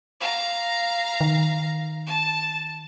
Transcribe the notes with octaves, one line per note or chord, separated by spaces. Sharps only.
F5 A#5
D#3
A5